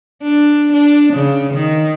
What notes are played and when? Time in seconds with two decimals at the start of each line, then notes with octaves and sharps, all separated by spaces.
0.23 D4
0.73 D4
1.14 C#3
1.54 D#3